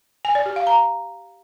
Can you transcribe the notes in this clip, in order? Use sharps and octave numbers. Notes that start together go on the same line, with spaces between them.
G#5
D5
G4
F5
A#5